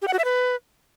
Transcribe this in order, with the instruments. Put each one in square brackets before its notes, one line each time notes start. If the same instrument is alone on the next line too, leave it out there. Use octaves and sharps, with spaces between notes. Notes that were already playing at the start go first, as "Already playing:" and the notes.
[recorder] G4
F#5
F#4
E5
B4